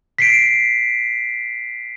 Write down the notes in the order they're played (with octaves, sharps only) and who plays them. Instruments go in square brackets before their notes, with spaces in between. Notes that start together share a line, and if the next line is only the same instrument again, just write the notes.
[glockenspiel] B6 C7 D7